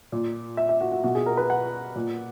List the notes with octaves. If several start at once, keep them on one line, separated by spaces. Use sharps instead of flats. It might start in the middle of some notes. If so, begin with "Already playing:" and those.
A#2
E5
E5
F#4
F#4
B2 F#4
G#4
A#4
B4
F#5
A#2